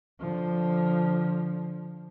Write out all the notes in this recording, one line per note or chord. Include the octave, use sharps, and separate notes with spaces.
D3 F3